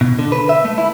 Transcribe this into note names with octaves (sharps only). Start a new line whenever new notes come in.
B2
D3
B4
E5
A3
E4